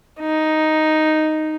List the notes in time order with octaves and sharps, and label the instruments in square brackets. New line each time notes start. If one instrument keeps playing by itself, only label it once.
[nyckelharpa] D#4